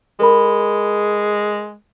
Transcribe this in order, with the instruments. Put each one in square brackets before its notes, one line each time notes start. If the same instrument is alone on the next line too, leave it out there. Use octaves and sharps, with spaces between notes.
[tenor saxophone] G#3 [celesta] A4 A#4 B5